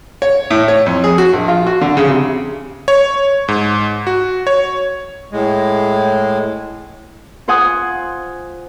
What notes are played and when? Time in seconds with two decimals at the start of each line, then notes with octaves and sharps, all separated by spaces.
0.22 C#5
0.51 A2
0.68 C#5
0.86 F2
1.04 G#4
1.18 F#4
1.33 A#1
1.48 F4
1.67 F#4
1.81 D3
1.97 C#3
2.09 C3
2.88 C#5
3.48 G#2
4.07 F#4
4.47 C#5
5.32 A2 G#3
7.48 F4 C5 F#5 G#5 D#6